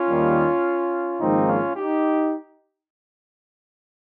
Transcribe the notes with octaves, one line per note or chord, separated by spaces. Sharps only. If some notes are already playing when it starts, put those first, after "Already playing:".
Already playing: C#4 F4
D#2 D#3 G3 A#3
G#1 G#2 F3 A#3 C4 D#4
C#4 F4
D#4 G4